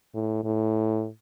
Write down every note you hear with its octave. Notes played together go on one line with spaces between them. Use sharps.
A2
A2